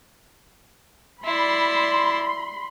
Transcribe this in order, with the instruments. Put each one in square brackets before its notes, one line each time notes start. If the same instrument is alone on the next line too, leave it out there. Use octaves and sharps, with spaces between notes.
[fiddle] E4 D5 [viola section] B5 C6